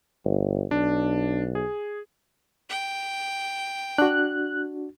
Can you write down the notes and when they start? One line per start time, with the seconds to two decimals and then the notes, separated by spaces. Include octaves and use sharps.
0.24 G1
0.71 B1 D4
1.55 G#4
2.69 G5
3.98 D4 F#4 F#6